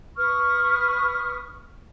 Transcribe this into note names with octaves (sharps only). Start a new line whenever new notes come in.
B4 C#6 D#6 F6